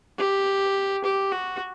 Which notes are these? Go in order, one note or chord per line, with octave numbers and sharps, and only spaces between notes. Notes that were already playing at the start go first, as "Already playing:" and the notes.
G4
G4
F#4